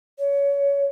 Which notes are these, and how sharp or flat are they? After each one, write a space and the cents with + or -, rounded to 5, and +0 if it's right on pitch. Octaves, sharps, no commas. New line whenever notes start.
C#5 +20